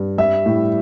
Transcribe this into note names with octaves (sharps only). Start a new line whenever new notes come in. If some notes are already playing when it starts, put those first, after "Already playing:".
Already playing: G2
G3 E5
A2